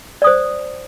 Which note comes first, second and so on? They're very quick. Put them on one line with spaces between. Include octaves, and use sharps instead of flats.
D5 D#6 C5